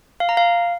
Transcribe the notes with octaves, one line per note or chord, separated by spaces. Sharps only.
F5
A#5
F5